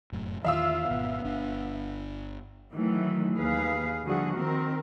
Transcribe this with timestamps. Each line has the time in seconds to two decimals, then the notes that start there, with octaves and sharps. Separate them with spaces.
0.12 F1 F#2 A2
0.44 E2 D#3 E3 F4 E5 F5 E6
0.89 G#1 B2 B3
1.24 G1 D4
2.72 D#3 E3 F#3 A3
3.35 D#2 G#4 B4 F5
4.03 D3 E3 F3 G3 F#4 G#4
4.36 D#3 C4 A#4